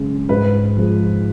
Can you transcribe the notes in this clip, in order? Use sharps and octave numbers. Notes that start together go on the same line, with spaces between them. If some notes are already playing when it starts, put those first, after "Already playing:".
Already playing: F#2 C#3 G#3
G#2 B4
F3 G#3